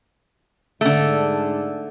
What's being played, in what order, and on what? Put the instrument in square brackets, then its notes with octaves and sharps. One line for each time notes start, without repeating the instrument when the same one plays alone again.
[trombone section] G#2 D4 [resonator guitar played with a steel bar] D3 A3